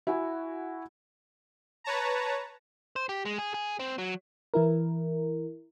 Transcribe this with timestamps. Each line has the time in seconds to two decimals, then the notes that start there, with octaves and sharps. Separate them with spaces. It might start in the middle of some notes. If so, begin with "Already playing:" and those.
0.07 E4 F#4 F#5 G#5
1.84 B4 C#5 A5 A#5
2.96 C5
3.09 G4
3.25 G#3
3.38 G#4
3.54 G#4
3.79 C4
3.98 F#3
4.54 E3 E4 A#4